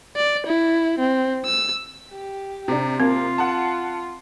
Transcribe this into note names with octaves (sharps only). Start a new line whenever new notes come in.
D5
E4
C4
E6
G4
C3 D4
C3 A#3 C4 F4
F#5 A5